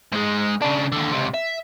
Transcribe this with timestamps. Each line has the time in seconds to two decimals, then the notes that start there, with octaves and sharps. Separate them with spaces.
0.13 G#2 G#3
0.62 C#3 D4
0.92 D#2 D3
1.12 C#2 C3
1.34 E5